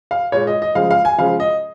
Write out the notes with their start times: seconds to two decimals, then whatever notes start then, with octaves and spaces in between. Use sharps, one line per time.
0.11 F5
0.32 A#2 G#3 C#5
0.47 D#5
0.62 D#5
0.75 C#3 F3 G#3 F5
0.91 F5
1.05 G#5
1.18 C#3 F3 G#3 F5
1.40 D#5